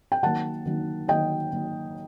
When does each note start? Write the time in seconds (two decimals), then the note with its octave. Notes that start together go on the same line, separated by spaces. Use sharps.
0.12 G5
0.23 D#3 F#3 A#3 D#4 F#5 A5
0.66 D#3 F#3 A#3 D#4
1.08 D#3 F#3 A#3 D#4 D#5 G5
1.51 D#3 F#3 A#3 D#4